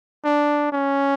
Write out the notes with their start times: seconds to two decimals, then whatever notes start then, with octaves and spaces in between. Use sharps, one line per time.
0.24 D4
0.72 C#4